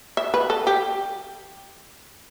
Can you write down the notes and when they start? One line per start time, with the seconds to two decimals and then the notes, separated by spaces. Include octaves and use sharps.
0.17 E5
0.34 B4
0.50 A4
0.67 G4